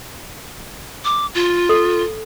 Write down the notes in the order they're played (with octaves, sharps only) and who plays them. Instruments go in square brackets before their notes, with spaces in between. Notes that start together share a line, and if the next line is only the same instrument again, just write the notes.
[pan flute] D6
F4
[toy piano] A4